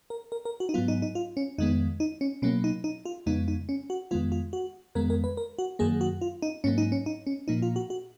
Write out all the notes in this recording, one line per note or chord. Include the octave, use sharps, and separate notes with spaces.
A#4
A#4
A#4
F#4
D#4
G#2 F#3 B3 F4
D#4
D#4
F4
C#4
F2 D#3 G#3 B3 D#4
D#4
C#4
B2 F#3 A#3 C#4
D#4
D#4
F4
F2 C#3 G#3 B3 D#4
D#4
C#4
F#4
F2 D#3 G#3 B3 F4
F4
F#4
F2 D#3 G#3 B3 A#4
A#4
B4
A#4
F#4
F#2 D#3 F#3 A#3 G#4
F#4
F4
D#4
G#2 F#3 A#3 C#4
D#4
C#4
D#4
C#4
A#2 F3 A#3 D#4
F4
F#4
F#4